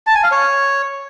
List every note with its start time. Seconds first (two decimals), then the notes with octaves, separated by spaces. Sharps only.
0.07 A5
0.15 G#5
0.23 F5
0.31 C#5